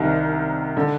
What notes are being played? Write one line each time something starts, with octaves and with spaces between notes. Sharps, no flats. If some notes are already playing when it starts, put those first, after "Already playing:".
Already playing: C2 C3 D#3
D3